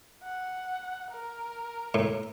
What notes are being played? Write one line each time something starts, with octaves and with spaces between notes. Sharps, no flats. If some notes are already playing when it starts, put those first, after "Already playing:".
F#5
A#4
A2